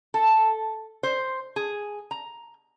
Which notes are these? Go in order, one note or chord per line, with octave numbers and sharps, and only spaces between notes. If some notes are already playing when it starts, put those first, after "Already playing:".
A4
C5
G#4
A#5